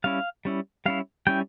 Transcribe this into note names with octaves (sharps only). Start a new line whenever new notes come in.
G3 C#4 E4 F5
G3 C#4 E4
G3 C#4 E4 F5
G3 C#4 E4 G5